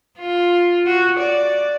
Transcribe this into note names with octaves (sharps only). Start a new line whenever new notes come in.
F4
F#4
D5